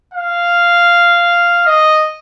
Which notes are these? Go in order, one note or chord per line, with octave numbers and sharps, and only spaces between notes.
F5
D#5